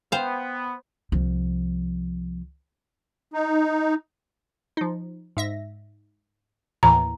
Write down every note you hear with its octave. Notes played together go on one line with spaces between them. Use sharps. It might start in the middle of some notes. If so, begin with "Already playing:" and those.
B3 C5 F5 G5
C2 F3
D#4
F3 D#4
G#2 E5 A#6
D#2 A2 E3 A#5